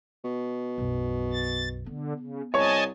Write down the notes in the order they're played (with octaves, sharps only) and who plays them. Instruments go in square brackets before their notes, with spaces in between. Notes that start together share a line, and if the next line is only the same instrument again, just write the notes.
[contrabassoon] B2
[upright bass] B1 F#2
[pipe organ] A6
[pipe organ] D3 [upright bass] B3
[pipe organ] C#3
[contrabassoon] C2 [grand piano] C#5 C#6 [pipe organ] D#5 G#5 A5